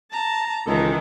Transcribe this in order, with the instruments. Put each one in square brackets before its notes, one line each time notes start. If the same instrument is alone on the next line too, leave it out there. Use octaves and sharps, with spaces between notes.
[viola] A5 [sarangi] A#5
[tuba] C#2 [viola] D#3 [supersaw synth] E3 G#3 A4